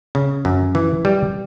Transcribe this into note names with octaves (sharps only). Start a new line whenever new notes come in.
C#3
F#2
E3
G3